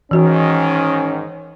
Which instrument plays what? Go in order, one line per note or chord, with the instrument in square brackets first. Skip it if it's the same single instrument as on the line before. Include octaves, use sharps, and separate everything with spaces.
[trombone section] G#2 D#3 [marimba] E3 F#4 [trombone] C#4